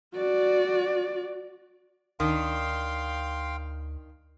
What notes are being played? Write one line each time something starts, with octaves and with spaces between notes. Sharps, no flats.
F#4 D5
D2 D#3 D4 F5 G5 C6